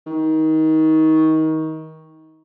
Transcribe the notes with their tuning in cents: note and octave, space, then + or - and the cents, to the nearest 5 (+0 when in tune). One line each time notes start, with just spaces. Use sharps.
D#3 +25